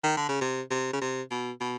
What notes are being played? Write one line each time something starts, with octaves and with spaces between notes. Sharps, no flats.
D#3
D3
C#3
C3
C3
C#3
C3
B2
B2